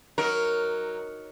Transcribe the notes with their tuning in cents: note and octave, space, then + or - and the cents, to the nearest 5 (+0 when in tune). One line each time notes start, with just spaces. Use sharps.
F#3 +0 D#4 +0 A#4 +0